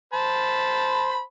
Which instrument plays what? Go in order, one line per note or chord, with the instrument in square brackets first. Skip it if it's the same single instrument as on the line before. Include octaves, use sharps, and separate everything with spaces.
[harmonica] C5 A5 B5